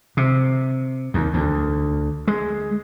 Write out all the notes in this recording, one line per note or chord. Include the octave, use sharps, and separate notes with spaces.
C3
D#2
D2
G#3